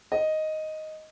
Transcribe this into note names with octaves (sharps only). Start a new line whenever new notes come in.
D#5